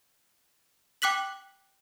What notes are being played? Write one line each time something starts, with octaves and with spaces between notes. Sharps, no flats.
G5 D6 F#6 B6 F#7